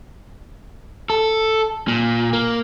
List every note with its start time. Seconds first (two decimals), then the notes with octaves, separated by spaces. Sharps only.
1.10 A4
1.88 A#2
2.33 A#3